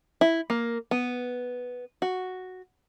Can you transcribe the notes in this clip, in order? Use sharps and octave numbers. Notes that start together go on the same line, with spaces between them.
E4
A#3
B3
F#4